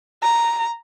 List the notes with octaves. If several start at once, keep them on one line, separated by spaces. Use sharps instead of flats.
A#5